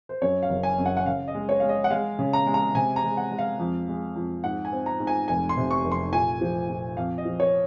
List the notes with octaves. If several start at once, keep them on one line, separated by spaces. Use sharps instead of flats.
C5
F#2 C#5
F5
F#1
G#5
F#2
F#5
F#5
C#3 F5
D#5
G#3
C#5
G#3 F5
D#5
F#5
G#3 F5
C#3
A#5
G#3
A#5
C3 G#5
A#5
G#3
F#5
G#3
F5
F2
G#3
F2
G#2 F#5
G#5
C4
A#5
G#2
G#5
F1 G#5
C6
C3
C#6
F1
C6
A#2 G#5
F3
A#2
F2 F5
D#5
F3
C#5